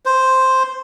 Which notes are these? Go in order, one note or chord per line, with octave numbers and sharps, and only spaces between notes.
C5